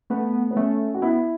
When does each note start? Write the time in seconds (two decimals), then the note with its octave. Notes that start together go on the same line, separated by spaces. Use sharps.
0.10 A3 B3
0.51 B3
0.57 A3 C#4
0.94 F#4
1.02 B3 E4